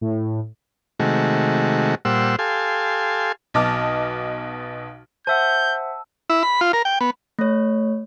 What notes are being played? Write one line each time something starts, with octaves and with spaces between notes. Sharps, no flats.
A2
C3 D#3 G#3 A3 F#4
A#2 G3 C5 F#5 E6
G4 A4 F5 G#5 C6
B1 B2 D#5 A5 D6 F6
C5 E5 F#5 A5 E6 G6
E4
B5
F4
A#4
G5
B3
A3 C#5